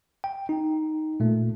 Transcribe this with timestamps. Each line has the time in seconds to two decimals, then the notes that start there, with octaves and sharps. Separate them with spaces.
0.24 G5
0.49 D#4
1.20 A#2 A3